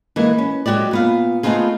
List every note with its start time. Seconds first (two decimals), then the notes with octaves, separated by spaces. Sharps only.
0.16 E3 G#3 A#3
0.38 C#4
0.66 F#3 G#3 F#4 G4 D5
0.91 A#2 B3 F5
1.43 A3 B3 C4 D#4 F4 G#4